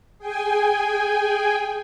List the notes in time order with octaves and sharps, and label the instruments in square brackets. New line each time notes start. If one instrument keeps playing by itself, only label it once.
[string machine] G#4 G5 G#5